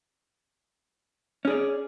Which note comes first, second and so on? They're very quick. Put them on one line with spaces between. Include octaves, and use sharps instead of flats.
C#4 G#4 D5